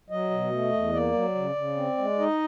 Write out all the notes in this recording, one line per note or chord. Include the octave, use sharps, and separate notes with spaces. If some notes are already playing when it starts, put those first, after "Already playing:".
F#3 D#5
B2
A3
E2
A#3 D5
F#3
C#3
C#3
C4
G#3
D#4 D#5